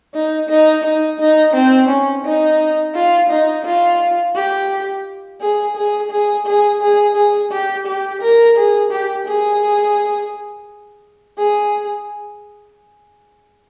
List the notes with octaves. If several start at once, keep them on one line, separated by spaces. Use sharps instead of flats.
D#4
D#4
D#4
D#4
C4
C#4
D#4
F4
D#4
F4
G4
G#4
G#4
G#4
G#4
G#4
G#4
G4
G4
A#4
G#4
G4
G#4
G#4